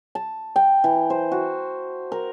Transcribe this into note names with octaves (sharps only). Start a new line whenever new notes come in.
A5
G5
E3
C5
F#4
A#4